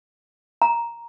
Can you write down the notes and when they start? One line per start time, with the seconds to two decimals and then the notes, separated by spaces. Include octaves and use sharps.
0.62 A#5